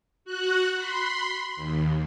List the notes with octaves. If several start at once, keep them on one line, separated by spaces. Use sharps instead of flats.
F#4 F#5 F#6
B5 C6
D#2